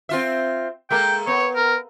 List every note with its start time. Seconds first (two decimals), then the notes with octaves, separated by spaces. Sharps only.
0.09 C4 F4 E5
0.90 G#3 A#3 A4 G5
1.27 B3 C#5
1.56 A#4